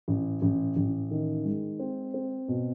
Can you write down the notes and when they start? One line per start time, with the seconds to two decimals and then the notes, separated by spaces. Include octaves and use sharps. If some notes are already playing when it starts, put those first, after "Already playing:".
0.08 A1
0.42 A1
0.76 A1
1.11 D#3
1.45 G#3
1.79 C4
2.14 C4
2.48 B2